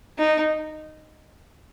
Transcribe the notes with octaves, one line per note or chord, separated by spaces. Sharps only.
D#4